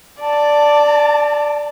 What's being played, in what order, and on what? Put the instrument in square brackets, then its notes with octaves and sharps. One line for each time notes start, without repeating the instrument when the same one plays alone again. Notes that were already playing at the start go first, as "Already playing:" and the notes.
[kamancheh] D5 [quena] A5